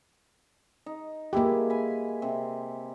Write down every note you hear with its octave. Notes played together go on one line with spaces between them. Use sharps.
D#4
G#3 A#3 E4 G4 B4
G#5 B5
C3